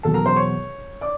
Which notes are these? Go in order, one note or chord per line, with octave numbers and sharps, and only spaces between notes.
E2 B2 F#3 A4 A5
A#4 A#5
C5 C6
C#5 C#6
D5 D6